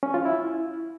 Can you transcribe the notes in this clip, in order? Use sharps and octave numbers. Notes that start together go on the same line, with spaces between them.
C#4
F4
E4